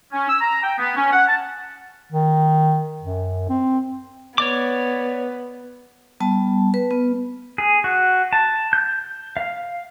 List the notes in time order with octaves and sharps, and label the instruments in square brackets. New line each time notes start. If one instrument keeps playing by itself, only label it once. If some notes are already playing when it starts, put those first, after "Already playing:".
[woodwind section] C#4
E6
A#5
G5
B3
C#4
F#5
A5
[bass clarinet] D#3
F#2
C4
[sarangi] B3 [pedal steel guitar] C#5 D5 D6
[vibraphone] G3 B3 A5
B4
B3
[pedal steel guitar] G#4
F#4
A5
G6
F5